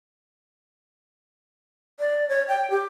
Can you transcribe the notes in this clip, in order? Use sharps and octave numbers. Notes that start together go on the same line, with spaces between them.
D5
C#5
G5
G4